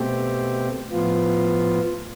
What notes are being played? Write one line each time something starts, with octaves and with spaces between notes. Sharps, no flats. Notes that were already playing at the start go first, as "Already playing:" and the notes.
Already playing: B2 A3 C4 G4
A2 F3 B3 F4